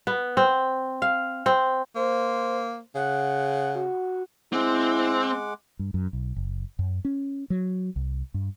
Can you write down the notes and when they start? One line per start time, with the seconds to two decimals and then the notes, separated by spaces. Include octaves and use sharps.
0.07 B3
0.37 C4
1.02 F5
1.46 C4
1.96 A#3 C5
2.96 C#3 F#5
3.75 F#4
4.53 G#3 C4 E4 F#5 D6
5.79 G2
5.94 F#2
6.13 B1
6.36 F#1
6.79 F#2
7.05 C#4
7.50 F#3
7.96 C2
8.34 G2